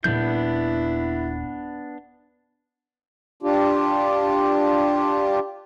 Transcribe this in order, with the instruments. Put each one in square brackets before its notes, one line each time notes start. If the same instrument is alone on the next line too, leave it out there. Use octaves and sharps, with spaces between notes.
[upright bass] D#1 C4 [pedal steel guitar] B3 D4 G6 [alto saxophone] E4
[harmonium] D4 F4 G4